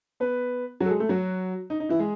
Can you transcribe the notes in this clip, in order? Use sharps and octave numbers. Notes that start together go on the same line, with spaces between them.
B3 B4
F#3 F#4
A4
G#3 G#4
A3 A4
F#3 F#4
D#4
D#4
E3 E4
G#3 G#4